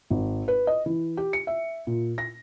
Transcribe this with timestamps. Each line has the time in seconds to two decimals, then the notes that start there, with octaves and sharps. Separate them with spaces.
0.10 G#1
0.48 B4
0.67 D#5
0.86 E3
1.17 G4
1.33 C#7
1.47 E5
1.87 A#2
2.18 A#6